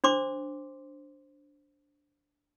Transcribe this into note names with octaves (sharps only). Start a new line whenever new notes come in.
D4 C5 C6 D6